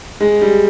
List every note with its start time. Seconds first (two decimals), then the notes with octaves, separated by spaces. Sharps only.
0.21 G#3
0.41 G3